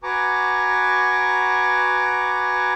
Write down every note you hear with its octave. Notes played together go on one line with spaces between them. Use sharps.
F#4 B4 G#5 A#5 C#6 D6